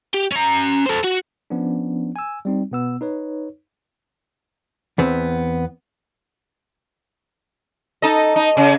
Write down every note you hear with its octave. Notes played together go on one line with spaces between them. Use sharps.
G4
C#4 A#5
A4 C5
F#4
F3 B3 C#4 D4
G#5 E6
G3 C4 D#4
B2 B3 E6
D#4 B4 C#5
E2 B3 C4
D#4 A4 D#5
D#4
C#3